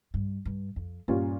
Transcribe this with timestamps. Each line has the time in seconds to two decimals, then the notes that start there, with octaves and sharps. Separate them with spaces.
0.14 G2
0.45 G2
0.76 F2
1.08 G2 A#2 G3 C#4 F4